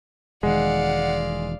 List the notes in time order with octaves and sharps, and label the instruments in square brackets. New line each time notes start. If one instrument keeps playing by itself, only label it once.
[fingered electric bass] E1 D#3 [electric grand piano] G#3 [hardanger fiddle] D5 F5 [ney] F#5